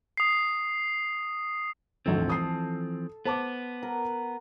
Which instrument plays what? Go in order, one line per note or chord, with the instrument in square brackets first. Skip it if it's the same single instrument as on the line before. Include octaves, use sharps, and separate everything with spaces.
[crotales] D#6 C7
[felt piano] D#1 G#1 D2 [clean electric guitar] E3 F3 C4
[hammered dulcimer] A4 [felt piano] D#6 C7
[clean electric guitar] B3 [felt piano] C5 A5 D6
[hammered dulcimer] A#4 F#5